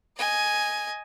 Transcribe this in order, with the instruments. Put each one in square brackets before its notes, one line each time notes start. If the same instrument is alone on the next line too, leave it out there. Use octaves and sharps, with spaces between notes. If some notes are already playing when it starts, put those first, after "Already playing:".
[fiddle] D#5 G#5